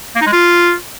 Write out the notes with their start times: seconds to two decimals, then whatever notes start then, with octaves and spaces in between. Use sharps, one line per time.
0.15 A#3
0.21 D#4
0.27 G#3
0.32 F4